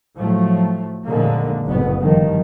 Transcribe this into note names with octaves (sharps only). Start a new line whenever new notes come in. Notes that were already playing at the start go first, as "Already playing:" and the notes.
A2 F3 F#3 A3
F2 A#2 D3 D#3 G#3 A#3
F#1 C2 F2 A2 B3
G1 D#3 F3 G3